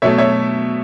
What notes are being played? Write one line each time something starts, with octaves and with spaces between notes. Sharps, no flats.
B2 F#3 A3 C#5 E5
C#5 E5